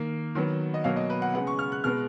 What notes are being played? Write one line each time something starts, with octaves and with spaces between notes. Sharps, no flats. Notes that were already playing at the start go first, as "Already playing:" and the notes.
Already playing: D#3 A#3
D#3 F#3 B3
D#5
B2 F#3 A#3 F5
D#5
B4
F#5
C#3 G#3 B3 F#5
C#6
F6
F#6
B2 G#3 B3 F6